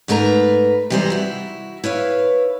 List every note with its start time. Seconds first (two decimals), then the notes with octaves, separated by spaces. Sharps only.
0.08 G#2 A3 A#4 B4 A5 A#5
0.90 C3 E3 G3 G#3 C5 A#5
1.10 E4 F#4
1.84 E4 B4 C#5 F5